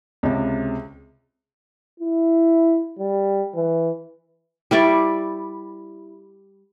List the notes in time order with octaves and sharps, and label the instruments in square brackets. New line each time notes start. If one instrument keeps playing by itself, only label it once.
[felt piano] C#2 C3
[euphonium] E4
G3
E3
[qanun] G3 E4 D5 C#6